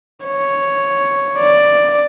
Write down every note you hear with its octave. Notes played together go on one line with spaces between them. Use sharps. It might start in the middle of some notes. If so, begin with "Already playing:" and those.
C#5
D5